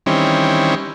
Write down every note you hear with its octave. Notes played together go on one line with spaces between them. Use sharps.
D#3 E3 G3 C4 C#4